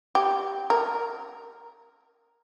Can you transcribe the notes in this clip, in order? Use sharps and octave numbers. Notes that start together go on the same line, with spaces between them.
G4
A#4